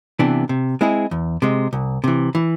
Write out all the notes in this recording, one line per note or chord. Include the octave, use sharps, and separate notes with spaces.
C3 E3 B3 D4
C3
G#3 C4 E4 G#4
E2
C3 G#3
C2
C3 E3
E3